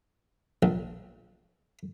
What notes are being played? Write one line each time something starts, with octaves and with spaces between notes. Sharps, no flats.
A#1